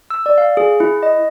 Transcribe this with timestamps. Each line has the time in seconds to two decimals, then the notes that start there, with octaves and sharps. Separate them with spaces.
0.10 E6
0.26 D5
0.38 F5
0.57 G#4
0.80 E4
1.03 D#5